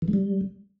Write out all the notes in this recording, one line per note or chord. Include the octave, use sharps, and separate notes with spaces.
E3
G#3
G3